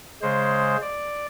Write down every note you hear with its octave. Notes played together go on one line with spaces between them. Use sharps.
C#3 G#3 C5
D5